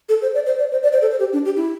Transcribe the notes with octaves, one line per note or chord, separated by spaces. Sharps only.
A4
C5
D5
C5
D5
C5
D5
C5
A4
C5
G4
D4
G4
E4